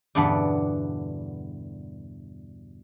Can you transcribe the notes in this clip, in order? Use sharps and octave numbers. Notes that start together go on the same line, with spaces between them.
E2 G2 B2 D3 B3 D4